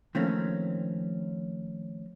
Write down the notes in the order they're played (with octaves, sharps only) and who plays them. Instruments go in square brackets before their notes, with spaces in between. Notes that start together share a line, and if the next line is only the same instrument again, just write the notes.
[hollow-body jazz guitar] D#3 F3 A3 A#3 C4 C#4